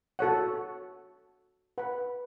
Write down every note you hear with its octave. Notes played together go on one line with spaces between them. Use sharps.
F#4 A4 C#5 F#5
B4 F#5 B5